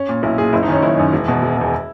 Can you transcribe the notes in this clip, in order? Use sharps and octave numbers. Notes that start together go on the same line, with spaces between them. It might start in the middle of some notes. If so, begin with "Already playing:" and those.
Already playing: C#4
A#2
B1 E4
A#2 G#4
F#1 E4
D#4
F#2 D#3 C#4
F#1 E4
F#2 D#3
E1
E2 B2
E1
E2 B2